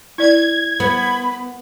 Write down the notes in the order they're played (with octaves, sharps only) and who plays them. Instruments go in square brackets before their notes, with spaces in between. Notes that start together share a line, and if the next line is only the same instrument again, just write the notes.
[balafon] E4 D5 [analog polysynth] G#6
[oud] B3 [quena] B5